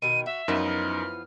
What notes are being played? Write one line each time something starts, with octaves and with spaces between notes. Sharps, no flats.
B2 D#3 D#7
F#4 E5
F#2 E3 F3 B3 D#4 A#4
F6